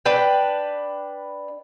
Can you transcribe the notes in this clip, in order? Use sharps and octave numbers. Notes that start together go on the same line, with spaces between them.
D4 B4 G5